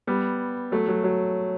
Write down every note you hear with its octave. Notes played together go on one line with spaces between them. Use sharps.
G3 B3
F#3 A3
F#3
F#3